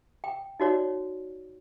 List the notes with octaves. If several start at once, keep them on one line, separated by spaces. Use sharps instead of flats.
G5
D#4 F#4 C#5 D5